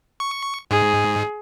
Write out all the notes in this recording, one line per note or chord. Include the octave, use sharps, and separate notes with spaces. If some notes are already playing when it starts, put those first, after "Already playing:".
C#6
G#2 G#4